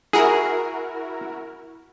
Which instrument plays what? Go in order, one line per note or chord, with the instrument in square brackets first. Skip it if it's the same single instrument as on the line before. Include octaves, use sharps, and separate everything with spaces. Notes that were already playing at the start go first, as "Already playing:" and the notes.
[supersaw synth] E4 F#4 A#4 [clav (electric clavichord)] G#4